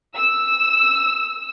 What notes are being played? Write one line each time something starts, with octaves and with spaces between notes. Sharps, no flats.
E6